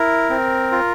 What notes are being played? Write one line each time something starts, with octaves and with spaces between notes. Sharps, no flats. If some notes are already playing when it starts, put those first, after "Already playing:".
Already playing: E4 A#4
C4
F4